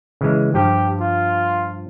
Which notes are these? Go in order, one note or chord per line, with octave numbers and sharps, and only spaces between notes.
C#3 E3 G#3
G2 F3 G4
F4